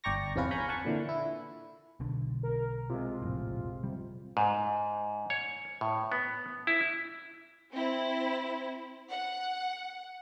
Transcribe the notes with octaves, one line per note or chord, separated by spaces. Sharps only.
G1 D5 G5 A#5 C#6 A#6
E2 C3 C#4 F4 B4
F5 G#5 A#5 B5 C#6 G6
F#5 G#5 A5 C#6
A#2 D3 E3
E4
B1 B2 D3
A#4
C3 G#3 F4
F1 A#1 A2
C3 G3
G#2
C#5
A2
B3
E4
C4 E4
F#5